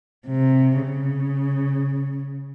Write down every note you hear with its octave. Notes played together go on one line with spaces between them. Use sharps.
C3
C#3